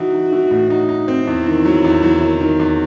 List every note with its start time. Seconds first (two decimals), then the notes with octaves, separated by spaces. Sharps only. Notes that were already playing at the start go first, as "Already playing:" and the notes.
Already playing: E3 D#4 F#4
0.13 D#4
0.32 E3
0.51 A2
0.70 D#4
0.89 D#4
1.08 C4
1.27 E2 E4
1.46 D#3
1.65 F#3
1.84 E2
2.03 F#3
2.21 D#3
2.40 D#3
2.60 E2